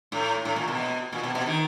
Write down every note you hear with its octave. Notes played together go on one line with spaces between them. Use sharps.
A2
A2
A#2
B2
A#2
B2
B2
D#3